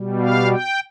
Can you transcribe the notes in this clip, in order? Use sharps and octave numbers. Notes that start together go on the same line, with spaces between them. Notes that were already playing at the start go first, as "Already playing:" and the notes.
Already playing: B2 G3
F5
G5